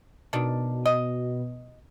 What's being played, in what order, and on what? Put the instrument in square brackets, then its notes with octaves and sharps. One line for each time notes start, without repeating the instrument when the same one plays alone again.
[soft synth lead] B2 [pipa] D#3 D4
[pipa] D#5